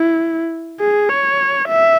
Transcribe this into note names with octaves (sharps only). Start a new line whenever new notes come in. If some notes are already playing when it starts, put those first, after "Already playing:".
Already playing: E4
G#4
C#5
E5